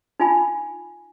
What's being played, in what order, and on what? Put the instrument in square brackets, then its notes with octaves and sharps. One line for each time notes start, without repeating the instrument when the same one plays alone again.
[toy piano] D#4 F4 G#5 B5